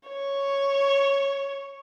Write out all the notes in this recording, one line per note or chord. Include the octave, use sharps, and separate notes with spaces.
C#5